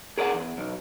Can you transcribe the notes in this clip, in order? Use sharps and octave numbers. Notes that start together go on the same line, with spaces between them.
G#4 A#4 D5 D#5 F#5
E2
B1